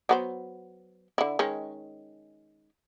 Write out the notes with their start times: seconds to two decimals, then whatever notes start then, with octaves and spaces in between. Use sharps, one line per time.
0.09 F#3 B3 C5
1.18 D3 E4
1.39 D#3 G#3 C#4